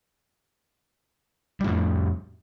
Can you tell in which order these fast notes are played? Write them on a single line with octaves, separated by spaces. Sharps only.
G3 A2 F2